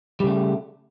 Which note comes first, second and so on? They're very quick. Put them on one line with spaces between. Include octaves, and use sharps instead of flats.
G3 C#3 A3